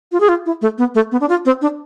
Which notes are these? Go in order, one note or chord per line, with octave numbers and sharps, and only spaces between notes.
F4
G#4
F4
E4
A3
B3
A3
B3
D4
F4
C4
D4